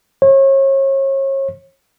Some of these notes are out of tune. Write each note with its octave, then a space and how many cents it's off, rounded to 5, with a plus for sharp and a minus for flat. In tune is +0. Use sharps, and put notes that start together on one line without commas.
C#5 -35